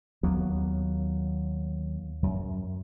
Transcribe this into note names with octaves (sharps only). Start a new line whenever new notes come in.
D#2 F#3 A#3 B3
F#2